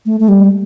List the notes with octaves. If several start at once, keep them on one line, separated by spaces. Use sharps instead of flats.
A3
A3
G3